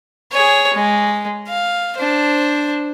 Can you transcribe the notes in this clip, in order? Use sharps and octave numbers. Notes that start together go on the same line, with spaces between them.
G#4 C#5
G#3
F5
D4 C5